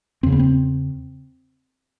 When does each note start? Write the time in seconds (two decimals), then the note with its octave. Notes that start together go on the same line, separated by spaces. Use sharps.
0.23 E2 C#3 C4
0.32 B3
0.39 C4